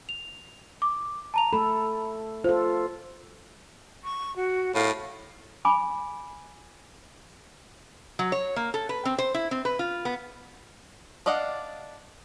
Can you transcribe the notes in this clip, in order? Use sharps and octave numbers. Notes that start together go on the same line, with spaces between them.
F7
D6
A5 A#5 F7
A3 A4 B5
F4 A4 C5
C#6
F#4
A2 F5
G#5 B5 D6
F#3
C#5
A#3
A4
B4
C4
C5
E4
C4
B4
F4
B3
D4 D5 D#5 F5 F#5